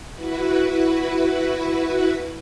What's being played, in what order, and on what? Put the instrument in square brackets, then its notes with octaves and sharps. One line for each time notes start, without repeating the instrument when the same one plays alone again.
[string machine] E4 F#4 B4